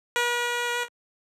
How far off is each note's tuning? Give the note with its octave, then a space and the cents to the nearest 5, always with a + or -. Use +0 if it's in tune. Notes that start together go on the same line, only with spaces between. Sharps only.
B4 -45